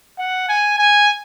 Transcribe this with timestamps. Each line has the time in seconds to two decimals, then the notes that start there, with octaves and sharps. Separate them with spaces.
0.19 F#5
0.49 G#5
0.78 G#5